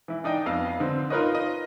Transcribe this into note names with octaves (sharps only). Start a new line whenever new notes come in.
E3 E4
D4 D#4 D#5 G5
F2 B3 D#5 F5 E6
D3 C4
D#4 F4 A#4 B4 C#5 D#5
D#5